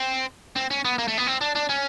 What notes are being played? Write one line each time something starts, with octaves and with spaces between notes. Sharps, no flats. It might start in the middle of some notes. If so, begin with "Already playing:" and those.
Already playing: C4
C4
C#4
B3
A#3
A3
B3
C4
D4
D4
C#4